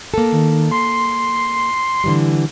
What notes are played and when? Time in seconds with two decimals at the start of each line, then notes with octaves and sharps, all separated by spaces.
0.14 A#3 A4
0.32 D#3
0.71 C6
2.04 D3 E3 G3